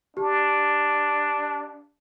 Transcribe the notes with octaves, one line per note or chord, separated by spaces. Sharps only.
D4 G4